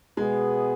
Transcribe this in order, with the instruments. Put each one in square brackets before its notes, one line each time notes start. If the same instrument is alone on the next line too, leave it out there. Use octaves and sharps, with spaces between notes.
[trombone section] B2 B3 G#4 [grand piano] G#3